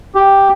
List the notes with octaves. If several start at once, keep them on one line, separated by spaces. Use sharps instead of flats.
G4